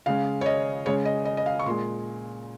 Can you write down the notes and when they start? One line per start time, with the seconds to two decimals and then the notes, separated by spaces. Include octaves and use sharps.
0.06 C#3 G#3 F5
0.41 C#5
0.46 D#5
0.86 C#3 G#3 C#5
1.05 D#5
1.25 D#5
1.37 D#5
1.46 F5
1.59 C#6
1.66 A#2 G#3 C6